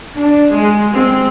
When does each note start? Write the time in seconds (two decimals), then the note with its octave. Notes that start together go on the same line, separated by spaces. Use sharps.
0.15 D4
0.54 G#3
0.92 G#3 C4